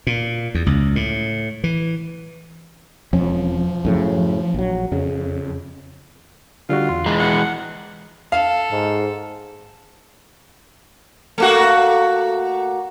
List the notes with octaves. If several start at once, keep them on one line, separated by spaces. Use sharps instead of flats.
A#2
E2
C#2
A2
E3
E1 F2 F3 C#4
F#2 A2 C#3
A#1 F#3
F2 C#3
D3 G3 F4 F#4
E2 C6
E3 G#3 A#5
F#5
A4 F5
G#2
A3 A#3 F#4